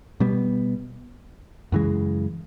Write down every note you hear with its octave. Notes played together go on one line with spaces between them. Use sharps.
B2 G3 B3
F#2 C#3 E3 G#3